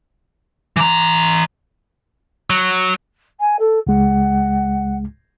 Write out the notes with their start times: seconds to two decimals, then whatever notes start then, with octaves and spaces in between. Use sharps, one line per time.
0.77 E3 A#5
2.50 F#3
3.40 G#5
3.59 A4
3.87 C#2 G#3 F#5